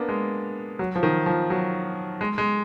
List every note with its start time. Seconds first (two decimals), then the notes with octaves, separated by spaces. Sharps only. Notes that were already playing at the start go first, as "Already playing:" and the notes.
Already playing: A#3 B3 D4
0.09 G#3
0.79 F#3
0.95 F3
1.03 D#3
1.26 F3
1.50 F#3
2.21 G#3
2.38 G#3